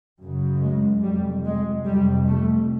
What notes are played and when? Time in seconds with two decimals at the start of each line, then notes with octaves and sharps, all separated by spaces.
0.21 F#2 C#3
0.61 G#3
1.03 F2 C3 G3
1.45 G#3
1.85 F2 C3 G3
2.27 A3